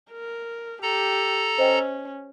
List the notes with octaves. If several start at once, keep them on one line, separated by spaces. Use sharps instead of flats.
A#4
G4 A4 A#5
C#4 C5 D#5 G5